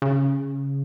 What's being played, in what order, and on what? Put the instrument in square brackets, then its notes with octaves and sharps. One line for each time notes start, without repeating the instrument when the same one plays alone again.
[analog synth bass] C#3